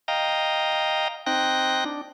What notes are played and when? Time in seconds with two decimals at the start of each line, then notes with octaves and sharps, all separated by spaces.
0.08 D#5 F5 G5 A#5
1.26 C4 D#4 G5 F#6 A#6
1.85 D4